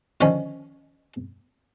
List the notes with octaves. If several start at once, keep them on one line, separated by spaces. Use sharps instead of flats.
D3 D#3 F3 C#4 C#5